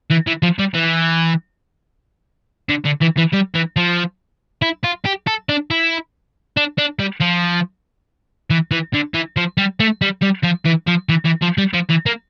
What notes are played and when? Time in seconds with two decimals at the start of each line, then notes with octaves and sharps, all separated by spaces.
0.10 E3
0.27 E3
0.43 F3
0.59 G3
0.74 E3
2.69 D3
2.85 D3
3.02 E3
3.18 E3
3.33 G3
3.55 E3
3.77 F3
4.62 E4
4.84 F4
5.05 G4
5.27 A4
5.49 D4
5.70 E4
6.57 D4
6.78 D4
6.99 G3
7.21 F3
8.50 E3
8.71 E3
8.94 D3
9.14 E3
9.37 F3
9.58 G3
9.80 A3
10.02 G3
10.22 G3
10.44 F3
10.65 E3
10.87 F3
11.09 E3
11.25 E3
11.42 F3
11.58 G3
11.74 F3
11.90 E3
12.06 A#3